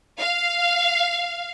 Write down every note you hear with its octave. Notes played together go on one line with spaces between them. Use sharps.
F5